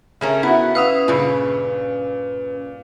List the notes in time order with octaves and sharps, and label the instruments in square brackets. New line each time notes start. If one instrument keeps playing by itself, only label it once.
[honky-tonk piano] C#3 [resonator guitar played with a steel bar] A3 C#4 A#4
[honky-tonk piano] B3 F#4 [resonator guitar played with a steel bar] E4
[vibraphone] C#4 B4 [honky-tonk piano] F5 D#6 E6
[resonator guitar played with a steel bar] G2 C#3 [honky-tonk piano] A#2